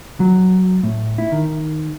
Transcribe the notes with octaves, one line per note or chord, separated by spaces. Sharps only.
F#3
A2
E4
D#3